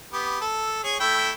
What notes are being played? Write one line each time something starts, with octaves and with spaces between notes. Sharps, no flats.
B3 G4
A4
G#4 C#5
A3 E4 G5